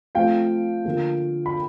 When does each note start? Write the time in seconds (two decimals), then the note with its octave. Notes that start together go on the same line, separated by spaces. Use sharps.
0.15 F3 A3 C4 F5 G5
0.85 D3 F3 A#3
1.46 B5